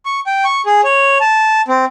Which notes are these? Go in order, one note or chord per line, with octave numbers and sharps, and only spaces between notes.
C#6
G5
C#6
G#4
C#5
A5
C4